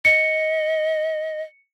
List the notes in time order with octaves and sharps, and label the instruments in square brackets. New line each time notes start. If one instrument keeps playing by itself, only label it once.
[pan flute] D#5 [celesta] C#7